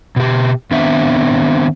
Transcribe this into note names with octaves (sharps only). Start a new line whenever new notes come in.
B2 G4
D#3 B3 C4 D4 E5